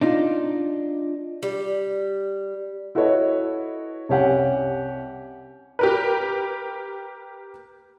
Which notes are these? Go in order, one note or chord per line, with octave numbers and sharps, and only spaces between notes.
D4 D#4 F4
G3
E4 F#4 A4 B4 C#5 D#5
C2 C#4 G4 F#5 G#5
G4 A#4 B4